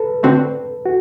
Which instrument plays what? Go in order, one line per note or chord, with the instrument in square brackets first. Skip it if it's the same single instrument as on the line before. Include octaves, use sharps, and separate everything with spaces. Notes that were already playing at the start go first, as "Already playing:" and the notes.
Already playing: [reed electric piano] A4 B4
[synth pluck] D3 A3 C4 F#4
[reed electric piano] F#4